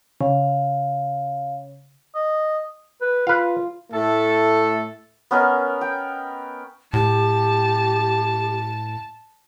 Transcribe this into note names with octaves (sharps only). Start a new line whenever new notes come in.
C#3 F5
D#5
B4
F4 B4 F5
A2 A3 A4
B3 C#4 A#4 D#5
G5
A2 G4 A5